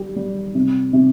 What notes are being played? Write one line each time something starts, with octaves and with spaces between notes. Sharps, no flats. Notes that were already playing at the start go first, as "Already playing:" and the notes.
Already playing: G3 G4
G3
C3
C3